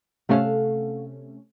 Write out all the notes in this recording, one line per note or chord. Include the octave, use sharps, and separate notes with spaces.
C3 A3 C#4 A4 F5 F#5